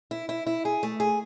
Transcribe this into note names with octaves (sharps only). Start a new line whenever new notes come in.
E4
E4
E4
G#4
A3
G#4